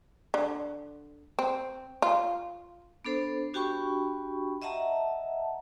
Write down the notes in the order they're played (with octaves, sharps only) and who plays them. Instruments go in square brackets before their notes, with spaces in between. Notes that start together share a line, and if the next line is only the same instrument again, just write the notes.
[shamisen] D3
C4
F4
[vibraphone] B3 D4 A4 C5
D4 F#4 G4 G5 B5 C#6
D#5 E5 F#5 A5 A#5